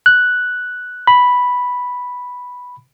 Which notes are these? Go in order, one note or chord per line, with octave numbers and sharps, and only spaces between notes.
F#6
B5